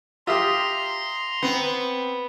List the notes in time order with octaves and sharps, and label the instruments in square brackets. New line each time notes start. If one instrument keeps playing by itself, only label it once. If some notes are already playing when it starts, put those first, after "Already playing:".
[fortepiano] F4 G4 [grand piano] E5 D#6 [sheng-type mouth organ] A#5 C6
[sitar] B3 [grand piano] C4